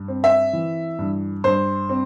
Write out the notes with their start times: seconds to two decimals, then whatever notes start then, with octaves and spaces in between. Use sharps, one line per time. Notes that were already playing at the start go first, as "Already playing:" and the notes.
Already playing: G2
0.08 C4
0.24 E5
0.53 E3
0.99 G2
1.44 G2 C5
1.90 C4